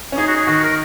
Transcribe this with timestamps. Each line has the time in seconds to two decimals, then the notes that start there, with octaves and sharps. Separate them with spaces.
0.12 C#4
0.17 D#4 G#4
0.27 F#4
0.36 G#4
0.46 D#3 F#4
0.63 A#4